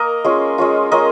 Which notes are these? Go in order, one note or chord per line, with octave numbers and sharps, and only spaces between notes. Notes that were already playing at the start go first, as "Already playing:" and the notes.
Already playing: A#3 A#4 D#5
G#3 C#4 F4
G#3 C#4 F4
G#3 C#4 F4 A#4 D#5